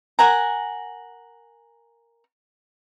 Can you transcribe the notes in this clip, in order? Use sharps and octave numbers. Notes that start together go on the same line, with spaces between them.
A#4 F#5 G#5 A#5